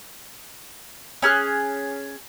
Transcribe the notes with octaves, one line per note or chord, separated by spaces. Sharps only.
C#4 G#4 F6 F#6